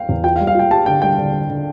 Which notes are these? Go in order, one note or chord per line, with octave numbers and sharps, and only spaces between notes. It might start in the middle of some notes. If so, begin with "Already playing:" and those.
Already playing: F5 G5
E2
F4 G5
F5
G3
F5
F4 G5
G4 A5
D3 G5
G3 G5
D3
D3
D3